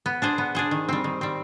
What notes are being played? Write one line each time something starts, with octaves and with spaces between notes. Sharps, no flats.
B3
D4 G#4 C5
B3
D4 G#4 C5
D#3
G3 C4
D#3
G3 C4